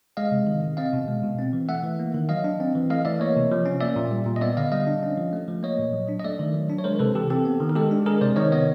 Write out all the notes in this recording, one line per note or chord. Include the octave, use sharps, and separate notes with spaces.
G#3 D#5 F5
C3
D#3
C3
C4 D#5 F5
B2
G#3
B2
C4
E3
A3 E5 F#5
E3
A#3
D#3
F#3 D#5 F5
D4
C4
E3
A3 D#5 F5
E3 D5 E5
A#3 C#5 D#5
C3
F3
C#4
A#3 D5 E5
A#2
G3
A#2
D#5
B3 D5 E5
D3 D#5 F5
G3 D#5 F5
D4
C#4
F3
A3
F3
A#3 C#5 D#5
A#2
F#3
D4
D#5
A3 D5 E5
D#3
F#3
D4
C#5
G#3 A#4 C5
C3 A4 B4
E3 G4 A4
C4 G4 A4
B3
D#3
A#4
G#3 G4 A4
D4
G#3 G#4 A#4
C3 C5 D5
D#3 C#5 D#5
B3 C#5 D#5